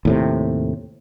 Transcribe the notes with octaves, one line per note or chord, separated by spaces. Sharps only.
D#2 A2 C3